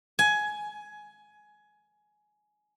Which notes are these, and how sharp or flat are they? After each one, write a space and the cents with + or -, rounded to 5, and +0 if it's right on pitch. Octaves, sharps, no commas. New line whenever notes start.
G#5 +15